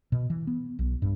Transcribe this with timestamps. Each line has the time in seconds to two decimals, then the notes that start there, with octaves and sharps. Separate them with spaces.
0.12 B2
0.30 E3
0.47 B3
0.79 B1
1.02 G2